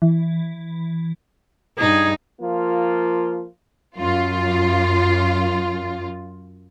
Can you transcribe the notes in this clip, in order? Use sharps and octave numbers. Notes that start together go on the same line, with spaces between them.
E3
G2 D#4 G#4
F3 A#3 F4
F#2 F4